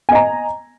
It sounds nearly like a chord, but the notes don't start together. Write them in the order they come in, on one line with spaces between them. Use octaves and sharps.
G#5 D#5 A#5